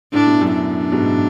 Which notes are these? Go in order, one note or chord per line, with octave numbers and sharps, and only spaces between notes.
A2 D4
B2
F#2 A2
D4
G#2 B2